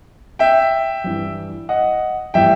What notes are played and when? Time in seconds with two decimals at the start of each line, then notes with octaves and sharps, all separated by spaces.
0.39 E5 G5
1.04 G2 E3 G3
1.69 D#5 F#5
2.34 A2 E3 G3 E5 G5